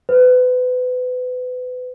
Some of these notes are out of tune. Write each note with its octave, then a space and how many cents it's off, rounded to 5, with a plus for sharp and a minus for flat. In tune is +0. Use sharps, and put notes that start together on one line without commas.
B4 +30